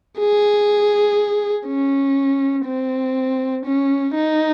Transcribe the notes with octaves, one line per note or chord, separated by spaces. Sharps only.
G#4
C#4
C4
C#4
D#4